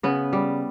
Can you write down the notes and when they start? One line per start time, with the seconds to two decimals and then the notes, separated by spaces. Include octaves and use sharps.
0.03 C#3 B3
0.33 G3